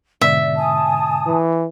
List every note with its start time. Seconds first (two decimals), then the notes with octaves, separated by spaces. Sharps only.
0.21 G#2 B2 D3 D5 E5
0.58 G#5 A5 D#6
1.27 E3